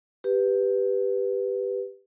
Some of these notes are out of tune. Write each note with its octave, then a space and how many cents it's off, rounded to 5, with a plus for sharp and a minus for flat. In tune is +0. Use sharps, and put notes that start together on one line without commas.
G4 +5 B4 +0